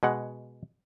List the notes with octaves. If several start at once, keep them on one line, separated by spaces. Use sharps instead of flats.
B2 G#3 F#5